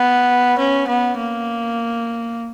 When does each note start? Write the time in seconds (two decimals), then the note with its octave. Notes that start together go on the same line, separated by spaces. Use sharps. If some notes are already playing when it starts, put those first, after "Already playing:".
Already playing: B3
0.59 C#4
0.88 B3
1.18 A#3